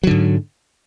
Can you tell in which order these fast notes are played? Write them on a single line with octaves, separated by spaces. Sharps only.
F#3 D3 G#2